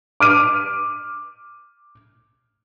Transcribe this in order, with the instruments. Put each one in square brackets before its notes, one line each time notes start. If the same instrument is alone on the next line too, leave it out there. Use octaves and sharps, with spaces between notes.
[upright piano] D6 F6 D#7